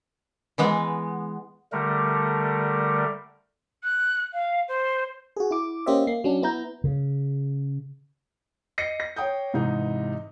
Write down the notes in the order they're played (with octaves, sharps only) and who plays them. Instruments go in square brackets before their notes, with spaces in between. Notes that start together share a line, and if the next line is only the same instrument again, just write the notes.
[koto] E3 G#3 B3
[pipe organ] D3 G3 A3 A#4
[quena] F#6
F5
C5
[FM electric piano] F#4 G#4
E4 D6
A#3 C#4 G4 C5 D#5 E5
A#3 C7
F#3 C#4 D4
B3 E4 A#5 G6
[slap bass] C#3
[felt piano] D#5 A#6 C7 C#7 D#7
A#6
C#5 G5 D#6 G6
G#2 C3 E3 D#4